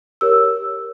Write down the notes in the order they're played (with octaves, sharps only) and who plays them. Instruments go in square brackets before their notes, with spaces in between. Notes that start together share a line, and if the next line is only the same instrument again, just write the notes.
[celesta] G4 A#4 C#5 E6